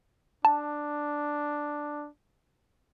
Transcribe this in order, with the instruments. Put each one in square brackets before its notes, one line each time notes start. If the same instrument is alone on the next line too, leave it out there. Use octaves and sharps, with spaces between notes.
[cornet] D4 [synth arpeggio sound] A5